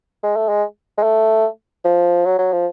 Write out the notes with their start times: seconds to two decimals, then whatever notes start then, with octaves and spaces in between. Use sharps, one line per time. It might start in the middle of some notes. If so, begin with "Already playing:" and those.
0.23 G#3
0.36 A3
0.49 G#3
0.98 G#3
1.03 A3
1.85 F3
2.25 F#3
2.39 F#3
2.53 F3